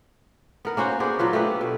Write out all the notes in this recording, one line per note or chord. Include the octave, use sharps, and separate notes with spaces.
B3 A#4
A#3 C#4 F#4 C5
B3 D4 G#4 C5
A#2 F#3 F4 B4
A3 B3 G4 B4
B2